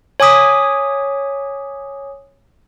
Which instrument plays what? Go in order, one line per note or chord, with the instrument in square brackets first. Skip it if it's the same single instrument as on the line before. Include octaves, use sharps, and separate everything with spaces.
[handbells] C#5 G#5 D6 D#6 B6